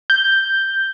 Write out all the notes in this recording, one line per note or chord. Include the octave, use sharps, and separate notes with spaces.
G6